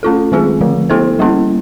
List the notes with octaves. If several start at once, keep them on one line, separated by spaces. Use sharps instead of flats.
A3 C#4 F4 A4
D#3 G#3 C4 F4 G#4
D3 F3 A3
B3 E4 A4 C5
G3 A#3 C#4 E4